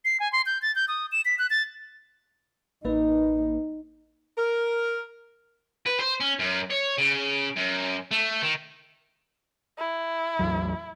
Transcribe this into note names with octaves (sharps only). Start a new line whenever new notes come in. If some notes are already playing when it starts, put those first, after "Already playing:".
C7
G#5
C6
G6
A6
G6
D#6
E7
B6
F#6
A6
A1 A#3 D#4 B4
A#4
B4
C5
C#4
F#2
C#5
C#3
F#2
A3
D#3
E4
A1 E2 F#3